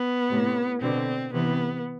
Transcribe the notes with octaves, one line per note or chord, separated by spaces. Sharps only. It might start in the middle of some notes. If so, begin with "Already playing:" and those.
Already playing: B3
A2 C3
B2 D3 C4
C3 E3 B3